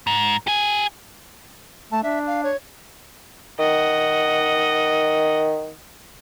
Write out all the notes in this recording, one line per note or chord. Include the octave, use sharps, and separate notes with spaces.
G#2
G4 G#5
A3 A5
D4 E5
F5
C#5
D#3 D#5 F#5